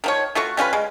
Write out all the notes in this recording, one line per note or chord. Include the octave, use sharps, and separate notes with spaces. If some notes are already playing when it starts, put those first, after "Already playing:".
D#3 F3 C#5
A3 F4 F#4 C#6
G3 C#4 F4 B4
G#3